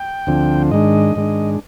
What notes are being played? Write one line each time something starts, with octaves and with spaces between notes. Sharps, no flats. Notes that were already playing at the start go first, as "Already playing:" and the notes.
Already playing: G5
D2 D3 F3 C4
G#2 D#3 G#3 D4 D#5
G#2 D#3 G#3 D4